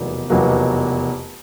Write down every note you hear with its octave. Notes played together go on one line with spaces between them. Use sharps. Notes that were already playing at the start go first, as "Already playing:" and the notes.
Already playing: F1 E2 B2 F#3 A#3
F1 E2 B2 F#3 A#3